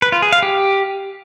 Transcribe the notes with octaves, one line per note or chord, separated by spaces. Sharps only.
B4
F4
G#4
F5
G4